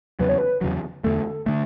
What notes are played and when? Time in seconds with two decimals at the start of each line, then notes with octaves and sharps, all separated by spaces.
0.20 E2 C#3 F#3 B4
0.29 C#5
0.38 B4
0.61 E2 C#3 F#3
1.04 E2 D3 A3 A4
1.46 D3 A3